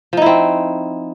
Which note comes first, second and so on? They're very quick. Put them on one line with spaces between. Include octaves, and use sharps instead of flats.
F3 D#4 E4 C4